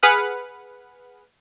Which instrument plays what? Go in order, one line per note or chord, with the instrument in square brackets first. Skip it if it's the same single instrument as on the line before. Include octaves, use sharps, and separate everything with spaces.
[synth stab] G#4 B4 F#5 F6